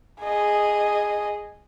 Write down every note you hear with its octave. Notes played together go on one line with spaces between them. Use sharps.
G#4 D#5